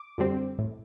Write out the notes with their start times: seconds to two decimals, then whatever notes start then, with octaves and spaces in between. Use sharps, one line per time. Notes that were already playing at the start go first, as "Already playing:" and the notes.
Already playing: D6
0.18 F#2 D3 G3 C4
0.59 A2